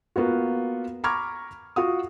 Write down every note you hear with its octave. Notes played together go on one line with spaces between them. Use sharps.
A#3 B3 F4 F#4
A#5 B5 C#6 D6 F6 G#6
F4 F#4 F#5 D#6